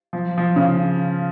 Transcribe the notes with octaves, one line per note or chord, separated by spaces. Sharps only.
F3
F3
C#3